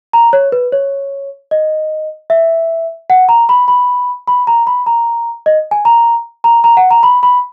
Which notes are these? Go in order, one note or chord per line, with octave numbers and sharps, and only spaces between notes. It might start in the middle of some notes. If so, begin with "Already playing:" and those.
A#5
C#5
B4
C#5
D#5
E5
F#5
A#5
B5
B5
B5
A#5
B5
A#5
D#5
G#5
A#5
A#5
A#5
F#5
A#5
B5
B5